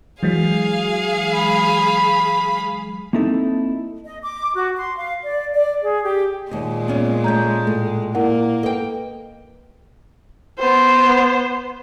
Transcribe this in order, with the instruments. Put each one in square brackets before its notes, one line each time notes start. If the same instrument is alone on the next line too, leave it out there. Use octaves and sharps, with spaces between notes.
[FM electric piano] E3 F#3 G#3 [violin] G#4 F5
[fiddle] B5
[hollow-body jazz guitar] A#3 C4 D#4 E4 A4
[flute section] D#5
D6
F#4
C6
F5
D5
D5
G#4
G4
[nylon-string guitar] D#2 D#5 [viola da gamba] A#2 G#3
[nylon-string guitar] B3 C#4
[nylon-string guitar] A3 C#4 [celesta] A#5 G6
[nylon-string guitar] A2 [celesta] A4
[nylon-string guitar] A#2 [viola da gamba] A#3 [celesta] E4 A#4 F#5
[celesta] A4 B4 [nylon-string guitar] D#5 G5
[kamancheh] B3 C5